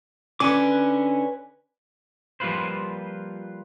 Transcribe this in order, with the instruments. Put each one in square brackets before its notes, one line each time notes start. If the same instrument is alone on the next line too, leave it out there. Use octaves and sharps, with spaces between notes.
[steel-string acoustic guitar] D3 C#4 [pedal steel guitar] B4 G#5 D6
[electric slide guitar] F3 G3 A#3 F4 B4 C5